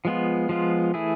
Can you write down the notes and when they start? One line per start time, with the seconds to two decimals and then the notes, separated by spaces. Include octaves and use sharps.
0.05 F3 G#3 B3 F4
0.49 F3 G#3 B3 F4
0.94 E3 A3 E4 G#4